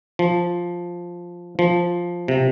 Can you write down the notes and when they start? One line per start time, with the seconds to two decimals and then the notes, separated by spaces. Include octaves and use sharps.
0.19 F3
1.59 F3
2.28 C3